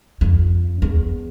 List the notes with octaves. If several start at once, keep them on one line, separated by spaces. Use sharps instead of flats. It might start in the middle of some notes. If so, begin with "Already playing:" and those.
F2
E2